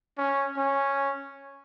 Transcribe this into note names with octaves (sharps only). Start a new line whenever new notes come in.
C#4
C#4